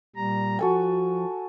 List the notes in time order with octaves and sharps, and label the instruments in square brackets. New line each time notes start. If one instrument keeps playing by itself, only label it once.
[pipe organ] A#2 G3 A#5
[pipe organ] F3 [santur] F#4 A4 G#5